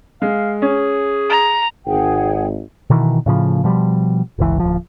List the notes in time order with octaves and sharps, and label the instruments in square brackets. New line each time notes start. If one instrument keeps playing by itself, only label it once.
[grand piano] G#3 [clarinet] F5
[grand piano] C#4 [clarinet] G#4
[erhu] A#5
[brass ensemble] G#1 [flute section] G#4 F#5 G5
[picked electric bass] B2 D#3 E3
A2 C#3 F3
B2 F3 G3
G1 C#2 E3
D1 F3